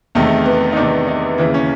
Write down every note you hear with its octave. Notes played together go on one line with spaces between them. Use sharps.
E2 C3 D#3 A3
B3
D#4
E2 C3 D#3 D4
D#4
D#2 C#3 E3 E4
C#4